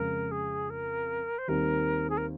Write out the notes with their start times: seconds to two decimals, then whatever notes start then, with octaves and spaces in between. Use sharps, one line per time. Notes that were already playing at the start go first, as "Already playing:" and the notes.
Already playing: F2 C#3 G#3 A#4
0.31 G#4
0.70 A#4
1.38 C5
1.48 D#2 D#3 G3 C4 G4 A#4
2.10 G#4
2.17 A#4